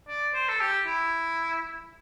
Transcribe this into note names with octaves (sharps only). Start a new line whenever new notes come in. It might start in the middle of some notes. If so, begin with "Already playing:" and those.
D5
C5
A4
G4
E4